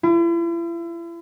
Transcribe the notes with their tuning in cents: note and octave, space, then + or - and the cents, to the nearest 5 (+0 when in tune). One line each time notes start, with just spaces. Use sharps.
E4 +40